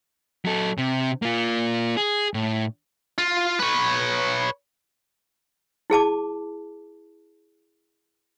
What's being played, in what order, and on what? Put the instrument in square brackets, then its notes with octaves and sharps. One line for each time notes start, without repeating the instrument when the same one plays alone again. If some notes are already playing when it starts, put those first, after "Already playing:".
[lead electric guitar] F#3 A4
C3
A#3 F4
G#4
A2
[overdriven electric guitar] F4
B4 C#5
[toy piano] E4 G#4 A5 D6